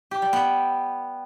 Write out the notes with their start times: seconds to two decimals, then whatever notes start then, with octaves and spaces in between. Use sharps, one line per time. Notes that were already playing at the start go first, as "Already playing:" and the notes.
0.11 G4
0.22 G3
0.33 B3